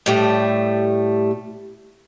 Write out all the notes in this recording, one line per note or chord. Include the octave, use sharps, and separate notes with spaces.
A2 G3 A3